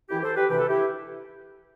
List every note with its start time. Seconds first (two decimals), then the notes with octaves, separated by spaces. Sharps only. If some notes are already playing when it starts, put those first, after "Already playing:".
0.09 F#2 E3 E4 G4
0.23 A4 C5
0.36 G4 B4
0.49 D2 C3 E3 G4 B4
0.59 A4
0.68 E4 G4